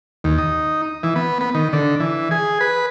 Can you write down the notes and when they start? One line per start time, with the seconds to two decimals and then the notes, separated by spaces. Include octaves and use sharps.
0.24 D#2
0.38 D#4
1.03 E3
1.16 B3
1.41 B3
1.55 D#3
1.73 D3
2.00 E3
2.31 G#4
2.61 B4